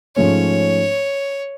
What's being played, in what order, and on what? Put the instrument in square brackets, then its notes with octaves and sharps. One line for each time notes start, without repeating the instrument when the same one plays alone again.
[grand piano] G#2 F3 A3 C#4 [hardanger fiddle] C#5